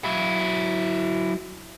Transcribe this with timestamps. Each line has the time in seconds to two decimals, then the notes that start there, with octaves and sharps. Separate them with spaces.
0.05 F#3 E4